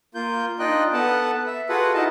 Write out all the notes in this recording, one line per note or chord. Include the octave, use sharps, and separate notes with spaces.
A#3 F4 G6
D4 D#4 F4 D#5 G5 F#6
B3 A4 F#5 A5
E5
F4 F#4 G#4 A4 B4 F#5
D#4 E4 F#4 D#5 F5 A5